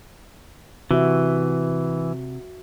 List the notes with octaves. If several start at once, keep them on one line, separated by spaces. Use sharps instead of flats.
C3 E3 F#4 E5